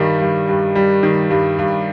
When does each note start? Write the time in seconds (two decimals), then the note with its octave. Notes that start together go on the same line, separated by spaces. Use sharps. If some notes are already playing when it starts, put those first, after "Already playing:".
Already playing: G2 D#3 G3
0.21 G2
0.49 G2
0.75 G3
1.03 D#3
1.31 G2
1.58 G2